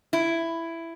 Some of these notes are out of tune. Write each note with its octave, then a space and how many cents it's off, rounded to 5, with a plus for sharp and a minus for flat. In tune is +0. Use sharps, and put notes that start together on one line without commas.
E4 +10